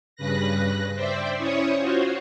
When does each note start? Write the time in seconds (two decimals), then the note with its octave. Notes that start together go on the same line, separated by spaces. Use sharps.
0.16 G2 C#3 B4 F#6 A#6
0.95 C5 D5 E5 G5
1.38 C#4 E4 C#5 C#6 D#6
1.78 F4 F#4 C5 C#5